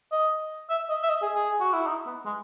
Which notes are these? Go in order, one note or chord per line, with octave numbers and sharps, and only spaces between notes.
D#5
E5
D#5
E5
D#5
G#4
G#4
F#4
E4
D#4
B3
G#3